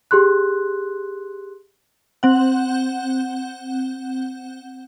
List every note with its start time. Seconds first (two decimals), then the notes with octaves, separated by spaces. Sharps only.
0.11 G4 G#4 C6 F#6
2.23 C4 F#5